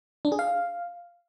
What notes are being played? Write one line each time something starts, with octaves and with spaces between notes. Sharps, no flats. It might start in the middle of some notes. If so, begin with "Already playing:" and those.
D4
G#4
F5